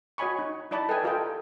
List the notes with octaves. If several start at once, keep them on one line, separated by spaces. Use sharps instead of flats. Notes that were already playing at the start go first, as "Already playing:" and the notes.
F#4 C#5 D#5 G#5 B5 C#6
D#4
D#4 E4 D5 A5 B5
A4 B4 D#5 E5 G5 G#5
F4 G4 A4 A#4 D#5 G5